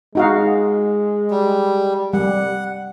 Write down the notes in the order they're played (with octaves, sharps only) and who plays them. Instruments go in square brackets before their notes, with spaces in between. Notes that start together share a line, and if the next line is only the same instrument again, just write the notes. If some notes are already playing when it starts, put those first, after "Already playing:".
[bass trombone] G#3 [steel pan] D#4 F#4 F5
[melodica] G3
[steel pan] G3 [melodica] F#5